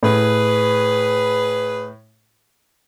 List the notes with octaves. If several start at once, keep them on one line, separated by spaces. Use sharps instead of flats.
A2 G#4 B4